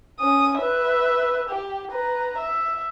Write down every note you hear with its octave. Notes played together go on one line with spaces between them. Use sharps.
C#4 D#6
B4 E5
G4
B4 A#5
E5